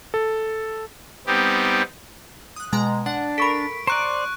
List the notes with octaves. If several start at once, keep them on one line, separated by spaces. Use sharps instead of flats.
A4
G3 B3 C4 D#4 G4
D#6 F#6
B2 G#3 A#5
D4 F#5
A4 A#4 B5 C#6 B6 D7
C5 D5 A#5 C#6 F#6 C#7